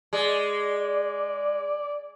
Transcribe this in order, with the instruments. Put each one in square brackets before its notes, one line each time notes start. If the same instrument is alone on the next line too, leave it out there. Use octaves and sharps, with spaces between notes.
[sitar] G#3 [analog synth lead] D5